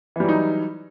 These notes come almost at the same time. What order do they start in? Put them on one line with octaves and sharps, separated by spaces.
E3 G3 F#3 D#4